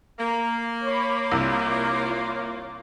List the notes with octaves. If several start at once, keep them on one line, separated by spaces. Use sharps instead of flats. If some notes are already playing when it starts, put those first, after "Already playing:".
A#3 A#5
C#5 B5 D6
C2 F4 C#5